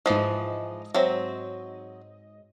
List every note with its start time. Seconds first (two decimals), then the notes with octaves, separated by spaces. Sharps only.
0.06 G#2 E3 F3 D#5
0.95 F#3 C4 C5 C#5 E5